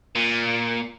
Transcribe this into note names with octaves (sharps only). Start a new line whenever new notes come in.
A#2